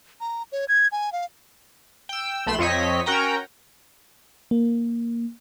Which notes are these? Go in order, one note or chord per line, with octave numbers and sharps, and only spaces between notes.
A#5
C#5
G#6
G#5
F5
G5 E6
B1 A3 B5 C6 E7
F2 C4 C#5 D#5 B6
C#4 F#4 A#4 G5 A#5
A#3